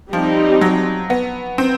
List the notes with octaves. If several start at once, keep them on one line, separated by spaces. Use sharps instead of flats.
F3 G3 C4 D#4 G4
F#3
B3
C4